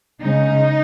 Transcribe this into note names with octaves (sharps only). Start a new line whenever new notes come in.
C#3 G#3 C#4 D#4